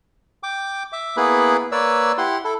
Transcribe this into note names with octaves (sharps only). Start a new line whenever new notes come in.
G5 D6
E5 D6
A#3 B3 E4 G#4 B4 B5
A#3 B4 C#5 D5 E6
E4 G4 F#5 C6
E4 A4